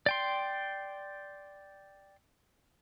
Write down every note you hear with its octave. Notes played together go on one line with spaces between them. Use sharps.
D5 G5 C6